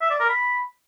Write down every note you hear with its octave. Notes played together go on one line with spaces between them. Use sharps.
E5
D5
A#4
B5